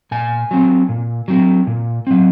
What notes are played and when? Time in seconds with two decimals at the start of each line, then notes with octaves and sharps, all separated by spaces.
0.11 A#2 G#5
0.51 F#3 C4
0.89 A#2
1.28 F#3 C4
1.67 A#2
2.07 F#3 C4